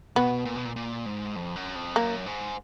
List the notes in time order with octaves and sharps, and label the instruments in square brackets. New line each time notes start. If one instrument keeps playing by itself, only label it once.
[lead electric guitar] B2 [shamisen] B3
[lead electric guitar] A#2
B2
A#2
A#2
G#2
F2
F#2
F2
[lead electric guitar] F#2 [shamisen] A#3
[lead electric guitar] G#2